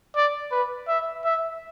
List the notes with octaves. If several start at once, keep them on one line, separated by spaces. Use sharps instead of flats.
D5
B4
E5
E5